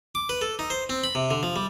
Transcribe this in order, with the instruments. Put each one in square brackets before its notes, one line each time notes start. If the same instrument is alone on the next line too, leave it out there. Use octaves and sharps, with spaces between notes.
[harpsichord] D6
B4
A4
D#4
C5
C4
B5
C3
D3
F3
G3